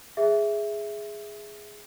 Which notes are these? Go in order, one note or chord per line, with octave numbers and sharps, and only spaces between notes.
G#4 E5